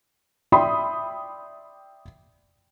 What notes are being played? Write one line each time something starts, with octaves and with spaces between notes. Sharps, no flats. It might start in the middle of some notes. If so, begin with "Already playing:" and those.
D5 E5 G5 B5 C6 D#6